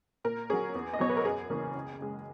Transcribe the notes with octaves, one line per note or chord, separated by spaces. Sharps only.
A#2 A#4
F#3 C#4 G#4
E2
D#5
B2 F#3 B3 C#5
B4
A#4
F#2 G#4
C#3 E3 A#3 C#4
C#2
C#3 G#3